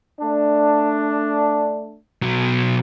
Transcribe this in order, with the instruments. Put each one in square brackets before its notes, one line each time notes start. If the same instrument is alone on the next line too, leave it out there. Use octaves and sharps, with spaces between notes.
[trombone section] A3 D4
[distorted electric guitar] B2 F#3